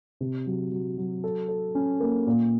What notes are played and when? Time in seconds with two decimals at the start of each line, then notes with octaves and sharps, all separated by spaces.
0.21 C3
0.46 F#3
0.72 F#3
0.98 F#3
1.24 A4
1.48 A4
1.75 C#4
2.00 A#3
2.26 A#2